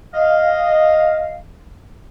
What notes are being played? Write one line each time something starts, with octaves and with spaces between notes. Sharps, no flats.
D#5 F5